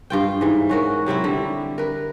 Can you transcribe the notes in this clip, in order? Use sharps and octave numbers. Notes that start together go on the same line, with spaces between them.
G2 F4 G5
G#2 E3
C#4 F#4 A#4
C3 F#3 C4 E4
D3 G3
A#4 B4